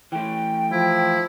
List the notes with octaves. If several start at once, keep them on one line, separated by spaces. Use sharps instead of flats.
E3 A3 G5
F3 E4